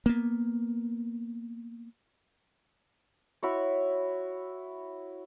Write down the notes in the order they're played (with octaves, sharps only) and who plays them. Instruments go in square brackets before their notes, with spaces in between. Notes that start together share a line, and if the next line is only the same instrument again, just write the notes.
[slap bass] A#3 B3
[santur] E4 F#4 C#5